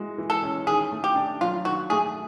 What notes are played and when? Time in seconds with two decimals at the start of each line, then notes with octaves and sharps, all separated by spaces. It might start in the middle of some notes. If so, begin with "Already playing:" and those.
Already playing: E3 G#3 F#4
0.18 E3
0.30 A4
0.43 C#4
0.67 D#3 G#4
0.92 A3
1.04 G4
1.16 D4
1.41 F#3 F4
1.65 D#3 F#4
1.90 A3 G#4